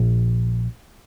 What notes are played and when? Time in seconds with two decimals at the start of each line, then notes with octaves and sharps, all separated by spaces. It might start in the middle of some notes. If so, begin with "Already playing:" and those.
Already playing: A#1